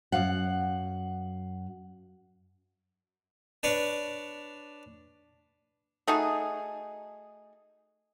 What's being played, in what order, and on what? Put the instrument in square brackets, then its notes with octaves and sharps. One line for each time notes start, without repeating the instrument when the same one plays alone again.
[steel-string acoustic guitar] F#2 F5 F#5
[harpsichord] D4 B4 C#5 D5
[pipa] A3 D#4 F#4 G#4